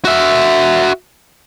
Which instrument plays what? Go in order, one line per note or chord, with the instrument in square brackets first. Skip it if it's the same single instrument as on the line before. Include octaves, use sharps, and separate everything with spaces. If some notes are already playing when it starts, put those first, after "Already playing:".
[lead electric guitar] F#4 E5